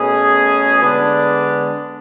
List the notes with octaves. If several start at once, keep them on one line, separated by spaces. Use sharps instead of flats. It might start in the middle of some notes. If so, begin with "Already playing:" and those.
Already playing: B2 A3 C#4 G#4
D3 G#3 B3 D4